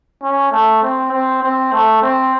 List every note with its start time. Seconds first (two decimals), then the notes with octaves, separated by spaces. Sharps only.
0.23 C#4
0.52 A3
0.82 C4
1.12 C4
1.43 C4
1.73 A3
2.03 C4